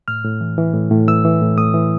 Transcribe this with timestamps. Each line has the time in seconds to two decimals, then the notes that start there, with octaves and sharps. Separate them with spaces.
0.08 A2 F6
0.24 A2
0.41 E3
0.58 E3
0.74 A2
0.91 A2
1.08 E3 E6
1.25 E3
1.41 A2
1.58 A2 D#6
1.74 E3